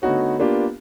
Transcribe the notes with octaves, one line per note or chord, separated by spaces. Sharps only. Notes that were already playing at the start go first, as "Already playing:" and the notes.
D3 A3 B3 D#4 F#4 C#5
A#3 B3 D4 F4 G4